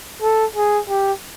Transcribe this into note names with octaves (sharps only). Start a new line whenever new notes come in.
A4
G#4
G4